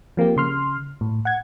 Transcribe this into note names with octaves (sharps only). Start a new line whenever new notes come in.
F3 A#3 C4 G4
C#3 C6 F6
A2
F#5 G#6